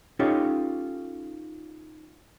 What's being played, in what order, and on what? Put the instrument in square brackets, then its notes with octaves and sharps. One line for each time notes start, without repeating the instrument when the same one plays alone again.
[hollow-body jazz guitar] C#4 D#4 F4 G4 A4 C#5